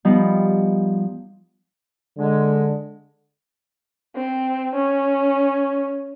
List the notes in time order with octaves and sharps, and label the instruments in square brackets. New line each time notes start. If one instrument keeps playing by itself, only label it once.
[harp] F3 G3 B3 D#4
[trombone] D3 [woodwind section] G#3
[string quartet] C4
C#4